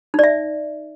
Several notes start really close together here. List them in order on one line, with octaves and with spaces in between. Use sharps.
D#4 D5 E5